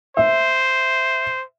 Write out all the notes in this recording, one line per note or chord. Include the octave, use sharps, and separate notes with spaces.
C5 E5